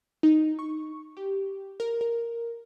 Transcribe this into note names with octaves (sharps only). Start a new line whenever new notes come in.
D#4
C#6
G4
A#4
A#4